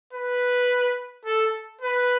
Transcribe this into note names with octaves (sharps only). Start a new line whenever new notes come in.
B4
A4
B4